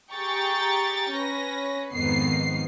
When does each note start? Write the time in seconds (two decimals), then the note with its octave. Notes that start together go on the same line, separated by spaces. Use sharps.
0.13 G4 G#4 G5 A#5 C#6 A6
1.12 C#4 B4 A#6
1.91 F2 G#2 D#3 B3 C7